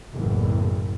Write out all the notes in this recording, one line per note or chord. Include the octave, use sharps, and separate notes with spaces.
F#1 B1 E2 A2